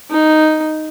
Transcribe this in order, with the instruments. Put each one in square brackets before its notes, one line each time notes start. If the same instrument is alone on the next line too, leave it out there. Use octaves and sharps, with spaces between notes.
[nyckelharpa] D#4